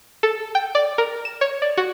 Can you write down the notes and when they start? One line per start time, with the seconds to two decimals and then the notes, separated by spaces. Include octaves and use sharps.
0.23 A4
0.55 G5
0.75 D5
0.98 A#4
1.25 E7
1.41 C#5
1.62 D5
1.77 F#4